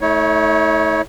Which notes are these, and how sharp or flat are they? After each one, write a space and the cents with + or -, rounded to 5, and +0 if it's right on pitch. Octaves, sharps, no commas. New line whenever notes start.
A3 -5 E4 -45 C#5 +0